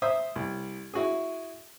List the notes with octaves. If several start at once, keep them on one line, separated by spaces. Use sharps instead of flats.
C5 E5 D#6
C2
E4 F#4 G#4